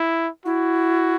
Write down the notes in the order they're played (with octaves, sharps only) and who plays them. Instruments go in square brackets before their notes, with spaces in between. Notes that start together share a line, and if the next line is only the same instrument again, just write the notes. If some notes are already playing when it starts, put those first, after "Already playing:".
Already playing: [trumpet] E4
[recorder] E4 [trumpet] F#4